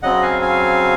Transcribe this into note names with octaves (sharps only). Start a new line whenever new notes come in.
C#3 F#3 C4 D#5 F#5
F5 G#5
F5 G#5